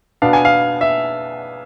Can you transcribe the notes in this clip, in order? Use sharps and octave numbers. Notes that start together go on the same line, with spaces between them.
B2 B3 D4 F5
G#5
F5
E5